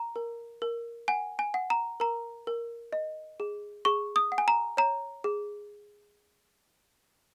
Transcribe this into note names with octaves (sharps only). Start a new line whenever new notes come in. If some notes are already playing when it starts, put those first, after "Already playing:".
Already playing: A#5
A#4
A#4
F#5 G#5
G#5
F#5
A#5
A#4 A#5
A#4
D#5
G#4
G#4 C#6
D#6
F#5
G#5
A#5
C#5 A#5
G#4